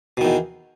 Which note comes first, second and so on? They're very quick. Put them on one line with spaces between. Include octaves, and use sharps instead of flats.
B2 D#3 E2